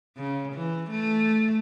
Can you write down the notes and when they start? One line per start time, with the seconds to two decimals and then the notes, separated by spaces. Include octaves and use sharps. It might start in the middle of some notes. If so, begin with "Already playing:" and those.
0.17 C#3
0.53 E3
0.91 A3